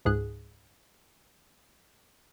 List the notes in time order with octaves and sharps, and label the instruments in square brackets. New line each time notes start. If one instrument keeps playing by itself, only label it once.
[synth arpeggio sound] C#2 G#2 G#4 F#6